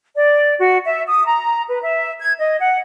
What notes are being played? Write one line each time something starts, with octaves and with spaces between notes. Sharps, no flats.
D5
F#4
E5
D#6
A#5
B4
E5
G#6
D#5
F#5